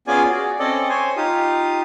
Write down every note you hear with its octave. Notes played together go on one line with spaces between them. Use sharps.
B3 C#4 F4 G#4 D5 G#5
F#4 G#4 D5
C4 C#4 A4 D5 D#5
C5 C#5 G#5 C6
D#4 F4 G4 D#6